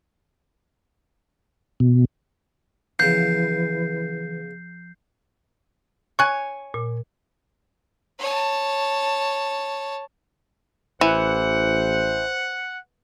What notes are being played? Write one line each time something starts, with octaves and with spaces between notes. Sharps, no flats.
B2
C#3 E3 F3 B3 G6 C7
C#5 G#5 C#6 F#6
A#2
C#5 A5
A1 E3 C5 F#5